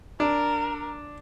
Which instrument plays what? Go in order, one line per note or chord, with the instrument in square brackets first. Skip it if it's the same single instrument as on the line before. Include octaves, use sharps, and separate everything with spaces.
[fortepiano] D4 [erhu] A#4